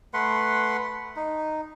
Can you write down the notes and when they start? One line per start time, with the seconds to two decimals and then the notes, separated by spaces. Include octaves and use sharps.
0.14 A3 B4 F#5 C6
1.16 D#4